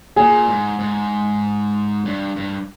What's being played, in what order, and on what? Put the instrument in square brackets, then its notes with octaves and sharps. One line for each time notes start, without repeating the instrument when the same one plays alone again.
[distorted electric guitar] A#2 [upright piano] G#4
[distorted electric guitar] G#2
G#2
G2
G2